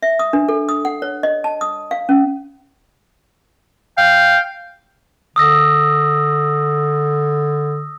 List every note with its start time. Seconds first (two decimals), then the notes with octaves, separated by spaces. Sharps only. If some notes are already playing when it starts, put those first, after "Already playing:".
0.02 E5
0.19 D#6
0.33 D4
0.49 A4
0.69 D#6
0.85 F#5
1.02 C#5
1.23 D#5
1.44 A5
1.61 D#6
1.91 F5
2.09 C#4
3.98 F5 G5
5.36 D3 D#6 E6 A#6